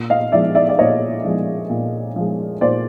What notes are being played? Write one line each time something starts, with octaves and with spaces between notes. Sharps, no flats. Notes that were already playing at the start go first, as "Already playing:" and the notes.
Already playing: A#2
D#5 F5
F3 G#3 D5 E5
D5 E5
D5
A#2 C#5 D#5
F3 G#3
A#2
F3 G#3
A#2 C5 D5